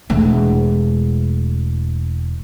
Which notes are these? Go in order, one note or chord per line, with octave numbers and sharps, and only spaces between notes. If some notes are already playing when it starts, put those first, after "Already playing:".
E1 A3